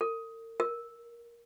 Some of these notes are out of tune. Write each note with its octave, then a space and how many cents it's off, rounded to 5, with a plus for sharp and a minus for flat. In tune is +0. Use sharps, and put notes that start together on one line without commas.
A#4 -45
A#4 +15